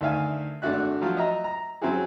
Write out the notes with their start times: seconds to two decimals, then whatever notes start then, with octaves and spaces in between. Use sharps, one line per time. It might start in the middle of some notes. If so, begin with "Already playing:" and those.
0.01 D2 D#3 E5 F5 G#5
0.62 G#1 A3 D4 F#4 E5 F#6
1.01 F3 F#3 F4 F#4
1.17 D#5 E5 A#5
1.44 A#5
1.81 F#3 C4 C#4 E4 F#4 G#4